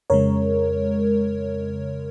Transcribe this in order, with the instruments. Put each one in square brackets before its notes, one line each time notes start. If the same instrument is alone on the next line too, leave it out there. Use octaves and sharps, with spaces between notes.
[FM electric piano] F2 C#3 G#3 A#4 C#5